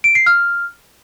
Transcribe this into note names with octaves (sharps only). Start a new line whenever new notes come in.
D7
C7
F6